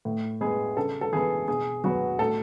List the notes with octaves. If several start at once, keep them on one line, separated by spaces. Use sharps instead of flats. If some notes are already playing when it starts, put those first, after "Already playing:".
A2
G#3 B3 G#4
C#3 A4
A4
E3 B3 G#4
B2 G#4
F#3 B3 F#4
A2 A4